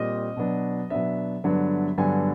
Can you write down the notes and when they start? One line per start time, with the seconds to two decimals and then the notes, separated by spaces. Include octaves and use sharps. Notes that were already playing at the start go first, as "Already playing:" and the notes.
Already playing: A#2 G3 C4 D#5
0.36 B2 F#3 B3 D4
0.90 B2 F#3 B3 D4 E5
1.44 G2 D3 F#3 B3 D4
1.98 G2 D3 F#3 B3 D4 G#5